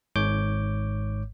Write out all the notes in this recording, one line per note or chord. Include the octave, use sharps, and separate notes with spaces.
G#1 G#2 C#5 D6 G6